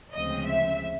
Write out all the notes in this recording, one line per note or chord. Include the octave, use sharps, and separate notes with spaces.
D2 C#3 F3 G#3 C4 D#5
E5